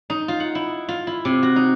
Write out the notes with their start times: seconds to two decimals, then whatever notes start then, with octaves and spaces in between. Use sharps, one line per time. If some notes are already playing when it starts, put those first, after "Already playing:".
0.10 D#4
0.28 F4
0.40 F#5
0.55 E4
0.89 F4
1.07 E4
1.25 C3
1.43 F#4
1.56 D#4